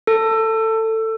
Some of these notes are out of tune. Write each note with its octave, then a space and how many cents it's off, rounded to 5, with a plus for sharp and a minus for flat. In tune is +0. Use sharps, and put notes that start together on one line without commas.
A4 +20